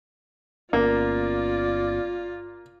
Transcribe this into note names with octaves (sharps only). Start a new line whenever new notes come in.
G1 A#3 B3 C#4 F4 D5